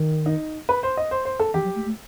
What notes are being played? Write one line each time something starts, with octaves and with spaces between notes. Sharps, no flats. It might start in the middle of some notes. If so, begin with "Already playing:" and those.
Already playing: D#3
D#4
B4
C5
D#5
C5
C5
A4
E3 G4
F#3
A3
A3